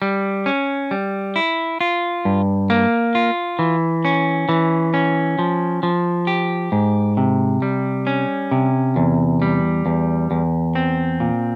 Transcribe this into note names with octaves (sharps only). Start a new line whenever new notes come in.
G3
C#4
G3
E4
F4
G2
A#3
F4
E3
C#4
E3
C#4
F3
F3
G4
G#2
C3
G3
C#4
C3
E2
G3
E2
E2
C4
A#2